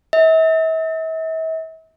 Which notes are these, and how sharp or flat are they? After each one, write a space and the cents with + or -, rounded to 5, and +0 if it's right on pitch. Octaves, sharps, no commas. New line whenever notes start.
E5 -40